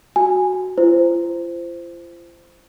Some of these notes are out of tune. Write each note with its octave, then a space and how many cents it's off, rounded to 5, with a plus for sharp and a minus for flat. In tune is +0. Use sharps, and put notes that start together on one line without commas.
F#4 +0 G#5 -10
F4 -40 C5 -10